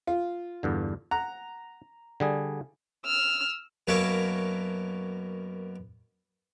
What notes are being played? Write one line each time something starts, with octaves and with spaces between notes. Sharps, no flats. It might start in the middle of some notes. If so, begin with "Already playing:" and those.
F4
E2 G2 D3
F#5 A#5
D3 G3 G#4
E6 F6
F#2 B2 A#3 C#5 E5 A5